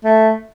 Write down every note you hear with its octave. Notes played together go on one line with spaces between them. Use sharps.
A3